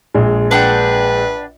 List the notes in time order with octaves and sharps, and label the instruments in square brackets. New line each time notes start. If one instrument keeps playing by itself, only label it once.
[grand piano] A#1 G#3
[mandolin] D4 F#5 G5 [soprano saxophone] B4